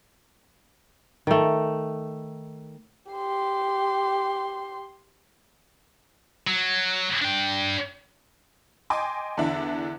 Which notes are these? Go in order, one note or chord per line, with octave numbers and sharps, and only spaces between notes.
D#3 A3
G4 C6
F#3
D4 G5
D#5 G5 G#5 C6 D6
E2 D3 E3 D4 E5